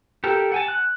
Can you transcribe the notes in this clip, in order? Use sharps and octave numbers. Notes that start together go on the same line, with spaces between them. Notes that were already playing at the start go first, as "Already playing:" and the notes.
G4 A4 A#4
F#5 G#5 A5
F#6